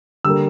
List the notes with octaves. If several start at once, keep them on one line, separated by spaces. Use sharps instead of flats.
D3 G3 A#3 E6